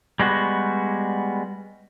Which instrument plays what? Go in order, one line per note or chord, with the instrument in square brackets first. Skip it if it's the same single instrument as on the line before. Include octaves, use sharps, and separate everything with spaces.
[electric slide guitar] G3 G#3 B3 F#4